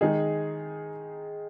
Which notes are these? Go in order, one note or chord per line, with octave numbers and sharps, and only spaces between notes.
D#3 G#3 D#4 G#4